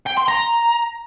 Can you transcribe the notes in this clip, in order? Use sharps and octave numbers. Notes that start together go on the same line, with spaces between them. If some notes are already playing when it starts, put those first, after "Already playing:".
G5
C6
A#5